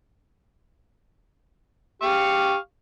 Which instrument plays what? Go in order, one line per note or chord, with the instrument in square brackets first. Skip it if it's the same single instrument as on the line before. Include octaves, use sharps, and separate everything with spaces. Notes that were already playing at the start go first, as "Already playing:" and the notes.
[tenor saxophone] G4 [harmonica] F5 C#6